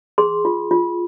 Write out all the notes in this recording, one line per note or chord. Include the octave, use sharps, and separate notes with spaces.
G#4 C6
F4
F4